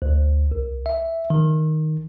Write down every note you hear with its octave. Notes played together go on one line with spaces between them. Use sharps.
D2
C2
E5
D#3